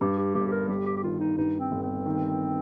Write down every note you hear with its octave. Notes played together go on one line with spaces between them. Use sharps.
G2 G4
G4
G1 G4
G4
A#4
G3 G4
G4
G4
D#3 F4
D#4
G2 D#4
C4
G1
C4
D#3